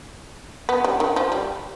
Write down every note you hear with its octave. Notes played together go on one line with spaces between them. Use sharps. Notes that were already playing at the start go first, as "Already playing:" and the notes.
B3
G3
D#3
F3
G3